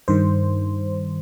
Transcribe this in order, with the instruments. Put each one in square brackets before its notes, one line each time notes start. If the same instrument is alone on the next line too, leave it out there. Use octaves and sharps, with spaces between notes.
[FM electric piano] G2 D#3 C5